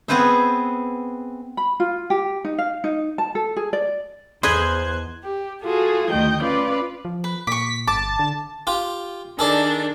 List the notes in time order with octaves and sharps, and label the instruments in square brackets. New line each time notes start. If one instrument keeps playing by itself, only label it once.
[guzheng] B3 C4 G#4 B4 C5 E5
[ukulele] B5
F4
G4
D#4
F5
D#4
A5
A4
G#4
D5
[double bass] E2 [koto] E4 G#4 D#5 [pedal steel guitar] C5 [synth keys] C6 F#6 G#6
[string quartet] G4
F4 F#4 G#4 A4
D2 D#3 D#5 G5 G6
C#4 F4 B4 D5 F5
[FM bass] F3
[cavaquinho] B4
[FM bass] A#2 [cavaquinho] C#6 D6 [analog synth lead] B6
[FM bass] G1 [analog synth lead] A5 [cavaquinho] D6
[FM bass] D3
[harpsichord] F4 G4
[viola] D#3 D4 [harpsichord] G#4 A4 D5